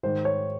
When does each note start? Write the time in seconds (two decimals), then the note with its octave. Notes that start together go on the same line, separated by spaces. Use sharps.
0.03 G#2 D#3 C5
0.25 C#5